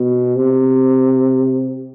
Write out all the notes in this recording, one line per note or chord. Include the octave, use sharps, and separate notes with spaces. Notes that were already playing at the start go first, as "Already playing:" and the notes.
Already playing: B2
C3